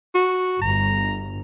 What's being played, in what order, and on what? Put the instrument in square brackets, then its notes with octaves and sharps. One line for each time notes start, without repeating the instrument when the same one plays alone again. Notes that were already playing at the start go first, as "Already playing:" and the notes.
[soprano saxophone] F#4
[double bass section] G1 [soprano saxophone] A#5